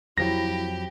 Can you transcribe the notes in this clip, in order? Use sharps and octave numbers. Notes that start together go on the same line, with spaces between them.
F2 F3 F#3 E4 G4 A#6